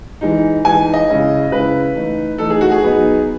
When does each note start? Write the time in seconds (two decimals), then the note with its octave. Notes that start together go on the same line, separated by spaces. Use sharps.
0.21 E3 G#3 D#4
0.65 E3 G#3 D#4 G#5
0.94 D#5
1.08 C#3 G#3 C#4 E4
1.51 C#3 G#3 C#4 E4 B4
1.95 E3 A3 D#4
2.38 E3 A3 D#4 A4
2.50 G#4
2.61 F#4
2.72 G#4
2.82 F#3 B3 D#4